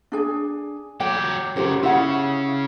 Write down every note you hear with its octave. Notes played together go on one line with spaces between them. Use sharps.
D4 G#4 G#5
F#3 G4 G5
F#2 C#3 F4 G4 C5
C#3 E4 F#5